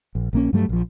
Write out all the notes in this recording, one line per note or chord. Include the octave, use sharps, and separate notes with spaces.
A#1
A#1 A#3 C#4
G2 F#3 G3 A3
A#1 F3